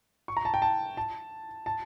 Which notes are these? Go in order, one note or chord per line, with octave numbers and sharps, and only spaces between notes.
C#6
A#5
A5
G5
A5
A5
A5